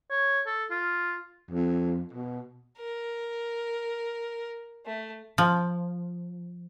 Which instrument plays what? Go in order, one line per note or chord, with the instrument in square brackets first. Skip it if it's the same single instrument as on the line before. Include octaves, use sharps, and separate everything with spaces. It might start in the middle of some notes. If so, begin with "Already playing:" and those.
[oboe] C#5
A4
F4
[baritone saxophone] F2
B2
[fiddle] A#4
A3
[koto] F3